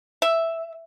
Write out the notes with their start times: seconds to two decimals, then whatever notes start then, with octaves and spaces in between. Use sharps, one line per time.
0.22 E5